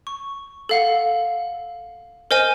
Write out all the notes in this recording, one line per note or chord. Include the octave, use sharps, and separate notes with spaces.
C#6
A4 F5 F#5
A#4 C5 D#5 G#5 D#7